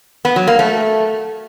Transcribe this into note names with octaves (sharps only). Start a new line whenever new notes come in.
B3
F#3
A#3
A3